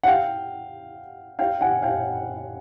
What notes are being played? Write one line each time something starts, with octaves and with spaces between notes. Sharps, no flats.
F#5
F5 G5
F5 G5
F#5 G#5
F5 G5